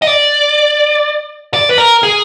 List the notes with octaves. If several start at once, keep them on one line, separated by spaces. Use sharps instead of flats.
D#5
D5
D5
B4
A#4
G#4